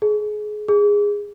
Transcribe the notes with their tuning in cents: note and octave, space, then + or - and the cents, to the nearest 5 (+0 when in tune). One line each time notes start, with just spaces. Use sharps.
G#4 +25
G#4 -15